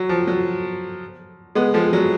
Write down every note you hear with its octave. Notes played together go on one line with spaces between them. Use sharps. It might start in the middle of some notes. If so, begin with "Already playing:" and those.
Already playing: F#3
F3
F#3
G#3 B3
F3 G#3
F#3